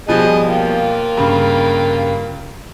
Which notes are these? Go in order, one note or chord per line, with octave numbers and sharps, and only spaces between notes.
B2 F3 G3 G#4 D#5
A#3 F4 G5
G2 C#3